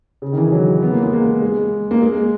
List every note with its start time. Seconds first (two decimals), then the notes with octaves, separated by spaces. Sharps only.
0.22 C#3
0.32 D#3
0.38 E3
0.52 F#3
0.83 B3
0.92 A#3
1.03 G#3
1.13 A#3
1.41 G#3
1.91 A#3
2.02 G#3